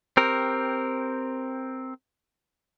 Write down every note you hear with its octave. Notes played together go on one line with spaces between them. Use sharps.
C4 G4 A#4